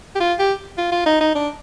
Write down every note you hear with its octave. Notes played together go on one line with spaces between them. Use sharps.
G4
F4
G4
F4
F4
D#4
D#4
D4